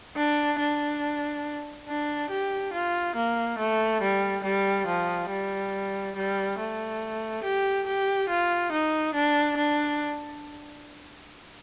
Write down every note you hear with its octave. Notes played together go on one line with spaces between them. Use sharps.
D4
D4
D4
G4
F4
A#3
A3
G3
G3
F3
G3
G3
A3
G4
G4
F4
D#4
D4
D4